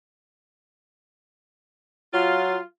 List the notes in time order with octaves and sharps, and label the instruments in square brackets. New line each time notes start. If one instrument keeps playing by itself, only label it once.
[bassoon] F#3 [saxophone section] F4